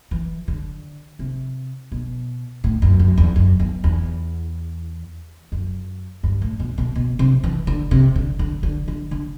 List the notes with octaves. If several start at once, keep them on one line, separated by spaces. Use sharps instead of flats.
E3
D3
C3
B2
A2
F#2
F#2
E2
F#2
E2
E2
F#2
G2
A2
B2
B2
B2
C3
E3
D3
C3
D3
D3
D3
D3
D3